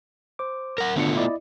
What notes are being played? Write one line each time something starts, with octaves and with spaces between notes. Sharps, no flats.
C5 D6
A#4 F#5 A#6
D3 A3 B3 D4 F4 C#7
E4 D5 D#5